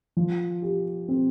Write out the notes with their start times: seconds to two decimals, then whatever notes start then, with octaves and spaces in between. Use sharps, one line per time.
0.17 F3
0.62 G4
1.08 C4